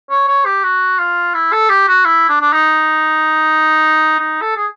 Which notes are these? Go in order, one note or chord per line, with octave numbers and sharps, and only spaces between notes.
C#5
C#5
G4
F#4
F4
E4
A4
G4
F#4
E4
D4
D4
D#4
D#4
A4
G#4